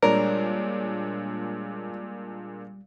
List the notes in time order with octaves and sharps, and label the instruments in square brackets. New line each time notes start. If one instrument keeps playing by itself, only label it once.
[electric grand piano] A#2 G#3 D4 [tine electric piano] G3 [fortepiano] A#4 [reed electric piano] C#5 D5